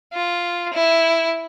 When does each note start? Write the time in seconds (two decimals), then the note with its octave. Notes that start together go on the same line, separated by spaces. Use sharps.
0.13 F4
0.74 E4